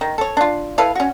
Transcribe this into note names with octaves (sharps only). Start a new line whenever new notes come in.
D#3
A4 C#5
D4 F4
E4 A4 B4 F5
C#4 F#4